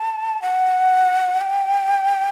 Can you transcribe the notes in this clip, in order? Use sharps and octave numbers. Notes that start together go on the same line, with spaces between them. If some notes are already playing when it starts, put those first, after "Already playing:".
Already playing: A5
F#5
G5